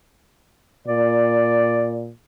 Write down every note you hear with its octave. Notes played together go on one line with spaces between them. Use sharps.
A#2 D5